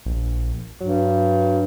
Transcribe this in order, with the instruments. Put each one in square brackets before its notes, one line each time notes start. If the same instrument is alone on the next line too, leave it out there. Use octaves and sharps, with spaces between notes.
[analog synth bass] A#1
[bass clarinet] G2 [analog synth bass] F#3